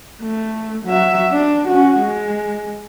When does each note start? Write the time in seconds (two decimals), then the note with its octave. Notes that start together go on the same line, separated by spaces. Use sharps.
0.22 A3
0.86 F#3 E5
1.32 D4
1.68 C#4 F#4
1.99 G#3